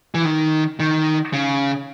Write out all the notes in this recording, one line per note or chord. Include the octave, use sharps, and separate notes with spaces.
E3
D#3
D#3
C#3